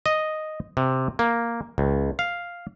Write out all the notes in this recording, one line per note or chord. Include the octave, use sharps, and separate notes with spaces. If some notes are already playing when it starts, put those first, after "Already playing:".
D#5
C3
A#3
C#2
F5